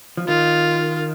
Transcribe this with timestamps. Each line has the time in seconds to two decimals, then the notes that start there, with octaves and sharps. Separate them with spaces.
0.17 F3
0.28 D#3 F4